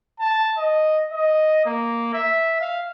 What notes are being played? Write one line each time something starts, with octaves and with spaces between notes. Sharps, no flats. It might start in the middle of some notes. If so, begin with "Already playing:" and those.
A5
D#5
D#5
A#3
E5
F5